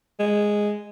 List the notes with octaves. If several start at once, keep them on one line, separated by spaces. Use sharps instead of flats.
G#3